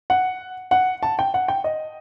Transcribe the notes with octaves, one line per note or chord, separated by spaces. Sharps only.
F#5
F#5
A5
G5
F#5
G5
D#5